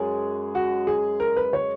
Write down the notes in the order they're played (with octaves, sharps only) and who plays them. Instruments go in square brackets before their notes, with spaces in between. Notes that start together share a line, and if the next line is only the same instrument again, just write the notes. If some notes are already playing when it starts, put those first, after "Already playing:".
Already playing: [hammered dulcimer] F#2 G#3 [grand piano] G#4
[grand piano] F#4
G#4
A#4
B4
C#5